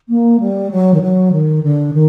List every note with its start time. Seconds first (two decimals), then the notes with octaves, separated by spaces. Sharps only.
0.09 A#3
0.40 G3
0.71 F#3
0.94 D#3
1.01 F#3
1.32 D#3
1.63 D3
1.94 D#3